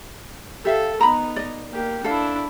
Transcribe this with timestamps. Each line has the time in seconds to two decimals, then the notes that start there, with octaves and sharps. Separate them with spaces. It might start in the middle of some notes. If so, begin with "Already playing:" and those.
0.65 G4 A4 E5 F5
1.01 B3 D#4 A#5 B5
1.36 D5 D#5
1.71 A#3 G4
2.04 D4 E4 A4 F5